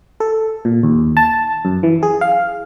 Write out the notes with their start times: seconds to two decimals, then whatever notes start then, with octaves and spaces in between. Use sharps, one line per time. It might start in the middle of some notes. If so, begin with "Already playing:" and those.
0.20 A4
0.65 A#2
0.83 D#2
1.17 A5
1.65 F#2
1.83 E3
2.03 G#4
2.21 F5